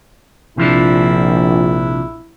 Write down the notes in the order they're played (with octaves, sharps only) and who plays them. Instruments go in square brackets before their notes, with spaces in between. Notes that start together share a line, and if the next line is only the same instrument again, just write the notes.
[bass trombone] A#1 [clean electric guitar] C3 F3 D4 [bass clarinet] E4